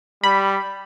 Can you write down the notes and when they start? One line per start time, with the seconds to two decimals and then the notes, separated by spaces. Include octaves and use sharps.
0.24 G3 B5